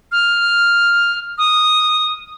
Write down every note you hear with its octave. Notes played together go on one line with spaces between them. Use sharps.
F6
D#6